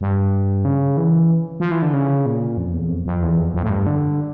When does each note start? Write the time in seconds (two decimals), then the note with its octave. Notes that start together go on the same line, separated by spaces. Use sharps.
0.01 G2
0.65 C#3
0.97 E3
1.60 F3
1.71 E3
1.82 D3
1.93 C#3
2.26 A#2
2.57 F2
2.74 E2
2.89 F2
3.06 F2
3.23 E2
3.38 F2
3.54 F2
3.63 A2
3.70 G2
3.87 D3